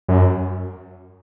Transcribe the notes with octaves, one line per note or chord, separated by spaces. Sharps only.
F#2